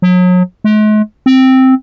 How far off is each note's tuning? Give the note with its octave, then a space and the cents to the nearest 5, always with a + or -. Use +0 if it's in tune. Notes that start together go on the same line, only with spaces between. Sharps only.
F#3 -35
G#3 +45
C4 +0